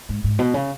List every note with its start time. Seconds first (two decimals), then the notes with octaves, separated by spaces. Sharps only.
0.09 G#2
0.24 G#2
0.39 B2
0.54 C#3